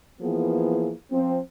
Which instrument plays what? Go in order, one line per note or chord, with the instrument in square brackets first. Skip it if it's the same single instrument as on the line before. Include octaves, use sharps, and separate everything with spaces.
[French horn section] E3 F3 A#3 B3 G#4
F3 C4